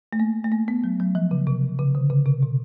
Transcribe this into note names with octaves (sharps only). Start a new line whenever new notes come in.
A3
A#3
A3
A#3
B3
F#3
F#3
F3
C#3
C3
C#3
D3
C#3
C3
B2